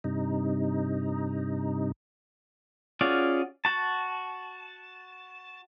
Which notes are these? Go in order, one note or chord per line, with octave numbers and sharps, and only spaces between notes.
G2 C3 D#4
C#4 F4 F#4 G#4 D5
F#4 A5